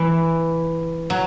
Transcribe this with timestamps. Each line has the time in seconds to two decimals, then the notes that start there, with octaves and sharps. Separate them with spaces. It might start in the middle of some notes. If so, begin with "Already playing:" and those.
Already playing: E3
1.10 F#3